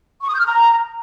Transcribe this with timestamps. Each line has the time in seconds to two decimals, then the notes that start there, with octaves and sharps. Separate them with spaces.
0.22 C#6
0.28 D#6
0.34 G6
0.39 F6
0.45 A#5